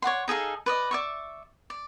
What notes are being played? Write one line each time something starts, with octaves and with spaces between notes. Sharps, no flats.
C#5 D5 F#5 C6
D#4 G#4 A4 F5
B4 D5 D#5
D5 E5 C#6
D5